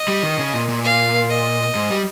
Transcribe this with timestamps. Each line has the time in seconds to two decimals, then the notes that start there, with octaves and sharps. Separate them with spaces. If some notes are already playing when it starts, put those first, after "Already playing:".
Already playing: D#5
0.08 G3
0.23 D#3
0.39 C#3
0.54 A#2
0.68 A#2
0.84 F5
1.30 D#5
1.75 G#2
1.90 G3